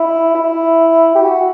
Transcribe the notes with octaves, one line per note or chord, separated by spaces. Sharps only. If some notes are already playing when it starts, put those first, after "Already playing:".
Already playing: E4
E4
G4
F#4